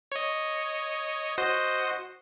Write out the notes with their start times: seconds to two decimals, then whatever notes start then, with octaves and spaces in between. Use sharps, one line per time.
0.12 C#5 D#5
1.38 F#4 C5 D#5